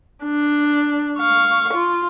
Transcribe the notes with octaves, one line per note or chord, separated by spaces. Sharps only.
D4
F5 C#6
F4